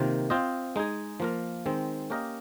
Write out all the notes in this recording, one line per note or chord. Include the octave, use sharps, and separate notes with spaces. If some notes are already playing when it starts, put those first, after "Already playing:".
Already playing: C3 D#3 A#3 F4
C4 F4 C5 D#5
G#3 D#4 G#4
F3 A#3 F4 A#4
D#3 G#3 C4
A#3 C#4 G4 A#4 D#5